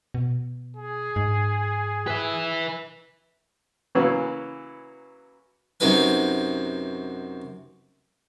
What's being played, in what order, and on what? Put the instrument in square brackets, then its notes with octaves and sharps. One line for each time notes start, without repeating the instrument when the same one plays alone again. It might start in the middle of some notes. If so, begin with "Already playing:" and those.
[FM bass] B2
[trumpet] G#4
[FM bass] G#2
[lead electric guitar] B4 E5
[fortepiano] C#3 E3 F#3 A#3 B3
[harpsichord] F#2 C3 D#4 F#4 B4 G#5